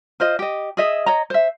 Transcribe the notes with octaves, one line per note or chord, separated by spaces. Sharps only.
F4 C5 D#5
G4 D#5
G#4 D#5 E5
C#5 D#5 A#5
C5 E5